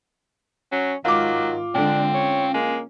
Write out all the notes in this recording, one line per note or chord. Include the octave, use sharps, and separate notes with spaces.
F#3 C#4
G#2 D#3 F#3 F4 D6
D3 G#3 C4 D4
C#4 C#5
G#3 A#3